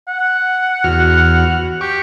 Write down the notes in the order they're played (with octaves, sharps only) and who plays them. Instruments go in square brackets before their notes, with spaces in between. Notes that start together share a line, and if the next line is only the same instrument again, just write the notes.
[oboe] F#5
[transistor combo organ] E2 F#4 F6
[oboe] G4 [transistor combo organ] C#6 D6